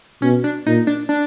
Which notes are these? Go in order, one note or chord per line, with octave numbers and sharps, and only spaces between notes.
B2 C#4
D4
A#2 D#4
D4
D4